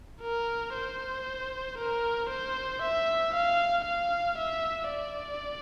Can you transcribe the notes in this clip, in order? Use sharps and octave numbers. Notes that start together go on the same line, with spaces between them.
A#4
C5
A#4
C5
E5
F5
F5
E5
D5